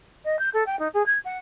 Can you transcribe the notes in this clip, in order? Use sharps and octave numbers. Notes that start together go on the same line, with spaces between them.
D#5
G6
A4
G5
D#4
G#4
G#6
F#5